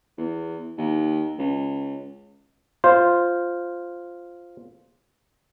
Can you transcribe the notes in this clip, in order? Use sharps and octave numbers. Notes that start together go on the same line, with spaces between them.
E2
D#2
C#2
F4 C5